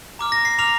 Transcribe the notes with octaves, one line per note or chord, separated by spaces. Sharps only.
A#5 D6 F6
A#6
C7
A#5 D6 F6 F7